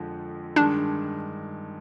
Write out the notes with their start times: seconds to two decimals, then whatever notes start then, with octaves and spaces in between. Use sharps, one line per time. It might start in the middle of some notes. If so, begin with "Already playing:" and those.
Already playing: F2 D3 F3 G#3
0.56 G2 D#3 G#3 D4